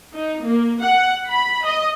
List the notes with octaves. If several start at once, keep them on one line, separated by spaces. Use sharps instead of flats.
D#4
A#3
F#5
B5
D#5